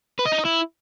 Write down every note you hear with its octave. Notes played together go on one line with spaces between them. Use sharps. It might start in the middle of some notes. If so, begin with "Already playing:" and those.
B4
D#5
D#4
D#5
E4